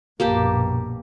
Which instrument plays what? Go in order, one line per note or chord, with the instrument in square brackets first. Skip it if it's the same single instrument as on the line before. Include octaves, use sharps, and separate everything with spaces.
[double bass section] A#1 F#2 B2 [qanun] A#3 G4 A5